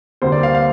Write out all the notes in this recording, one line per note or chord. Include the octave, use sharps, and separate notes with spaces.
D2 C3 G3 A#3 C5
D5
F5
F5